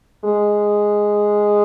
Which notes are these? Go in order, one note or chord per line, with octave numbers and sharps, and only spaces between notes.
G#3